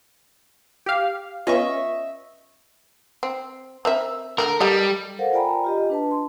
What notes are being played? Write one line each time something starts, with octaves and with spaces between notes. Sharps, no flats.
G4 F5
B3 C#4 F4 D#5 E5 C#6
C4
C4 A#4 E5
D3 E3 A3 A#4
G3 G4 A4 D#5
A4 A#4 C5 F5 F#5
F4 D5 G5 G#5 A#5 B5
F4 G4 D#5
D4 B4 A5
C6